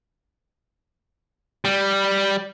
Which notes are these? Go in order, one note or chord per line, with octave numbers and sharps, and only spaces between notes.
G3